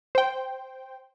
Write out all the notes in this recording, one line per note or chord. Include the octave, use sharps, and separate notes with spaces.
C5 G5